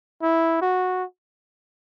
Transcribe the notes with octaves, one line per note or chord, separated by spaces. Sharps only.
E4
F#4